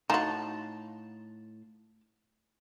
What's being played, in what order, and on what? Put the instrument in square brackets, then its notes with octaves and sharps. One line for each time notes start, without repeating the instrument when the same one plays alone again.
[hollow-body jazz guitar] A2 F5 C6 [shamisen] D#4 F#4 [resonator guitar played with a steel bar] A5